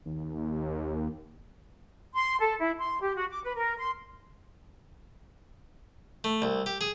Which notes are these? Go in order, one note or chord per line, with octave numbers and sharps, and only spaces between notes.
D#2
C6
A4
E4
C6
G4
F#4
D6
B4
A#4
C6
A3
C2
G4
G#4